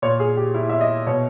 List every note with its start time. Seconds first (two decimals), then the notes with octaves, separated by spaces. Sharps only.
0.02 A#2 C#5
0.20 G#4
0.37 G4
0.54 E4
0.69 E5
0.81 D#5
1.07 B2 C#5